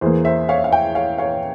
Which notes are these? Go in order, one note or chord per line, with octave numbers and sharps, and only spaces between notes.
E2 E3 A#3 G#4 C5
C5 E5
C#5 F5
E5
F5
E5 G5
C#5 F5
C#5 F5